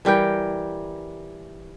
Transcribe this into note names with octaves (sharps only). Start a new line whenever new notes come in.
E3 G3 A#4 G5